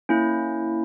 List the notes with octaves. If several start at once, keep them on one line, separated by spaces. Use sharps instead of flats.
A#3 C#4 E4